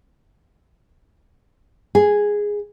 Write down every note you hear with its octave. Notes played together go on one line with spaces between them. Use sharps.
G#4